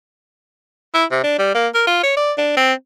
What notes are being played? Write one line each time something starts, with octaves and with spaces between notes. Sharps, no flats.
E4
C3
D4
G3
A#3
A#4
F4
C#5
D5
D4
C4